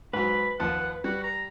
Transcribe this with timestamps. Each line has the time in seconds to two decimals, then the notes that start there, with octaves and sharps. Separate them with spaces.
0.13 G#2 F#3 B4 B5
0.60 D#2 F3 F#5 A5
1.04 G3 F#4
1.23 A#5